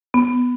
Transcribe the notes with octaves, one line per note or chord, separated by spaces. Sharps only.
B3